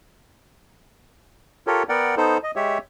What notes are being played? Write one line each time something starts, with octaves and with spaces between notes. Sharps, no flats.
F4 G4 A4 A#4 C#5
B3 A#4 D5 F#5 G5
B3 D#4 A4 C5
D#5
G#3 G4 C#5 E5